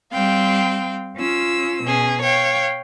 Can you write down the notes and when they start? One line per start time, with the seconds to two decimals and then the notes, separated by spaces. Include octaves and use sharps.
0.12 G3 C4 F5 G5
1.16 C#4 F4 E6
1.83 B2 C#4 G#4
2.23 C#5 F5 G5